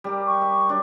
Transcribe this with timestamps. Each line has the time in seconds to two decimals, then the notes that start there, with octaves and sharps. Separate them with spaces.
0.04 G3 G4 A#4
0.27 C#6
0.42 E5
0.69 F#3 D4